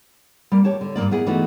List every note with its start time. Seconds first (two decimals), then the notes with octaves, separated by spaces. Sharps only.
0.52 G3 A#3
0.64 G4 C#5 A5
0.81 D3
0.96 G2 E3 A#3 D5
1.11 B3 E4 G#4
1.27 E3 A3 B3 D#4 F#4 G#4